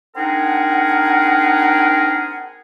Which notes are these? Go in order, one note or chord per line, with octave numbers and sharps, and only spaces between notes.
C4 D4 D#4 G#4 A#4 F#5